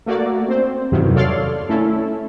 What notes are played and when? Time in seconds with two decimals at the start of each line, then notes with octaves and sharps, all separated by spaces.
0.06 A3 A#3 F#4 D5
0.48 C4 C5
0.92 E2 G2 C3 D#3 F#3
1.15 A4 C#5 D5 F5 C6 F6
1.69 A3 C#4 E4 A4